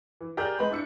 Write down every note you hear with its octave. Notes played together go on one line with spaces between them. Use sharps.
E3
G4 G#4 A#4 D5 A#5 G6
G#3 B4 A#5 B5
D4 E4 C#7